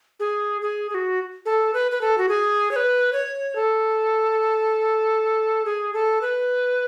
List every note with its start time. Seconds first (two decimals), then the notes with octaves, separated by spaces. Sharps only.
0.20 G#4
0.62 G#4
0.90 G#4
0.94 F#4
1.46 A4
1.74 B4
1.92 B4
2.01 A4
2.18 F#4
2.29 G#4
2.71 C#5
2.76 B4
3.13 C#5
3.55 A4
5.65 G#4
5.94 A4
6.21 B4